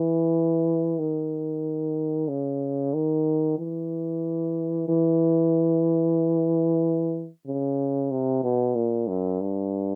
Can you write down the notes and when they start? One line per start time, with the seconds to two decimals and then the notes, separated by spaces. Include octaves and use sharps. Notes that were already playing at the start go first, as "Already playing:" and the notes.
Already playing: E3
0.99 D#3
2.28 C#3
2.94 D#3
3.58 E3
4.88 E3
7.47 C#3
8.11 C3
8.44 B2
8.75 A#2
9.08 F#2
9.41 G2